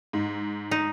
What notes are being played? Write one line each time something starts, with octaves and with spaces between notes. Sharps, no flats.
G#2
D#4